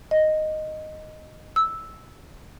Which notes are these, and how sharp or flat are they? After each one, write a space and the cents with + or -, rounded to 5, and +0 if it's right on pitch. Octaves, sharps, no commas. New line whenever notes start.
D#5 -5
E6 -5